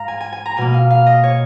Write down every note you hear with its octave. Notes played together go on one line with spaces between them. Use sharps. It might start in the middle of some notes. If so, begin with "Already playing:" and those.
Already playing: G#2 F5 A#5
G#5
G#5
G#5
A#5
B2 A#3 G#5
F5
F5
D#5
C#5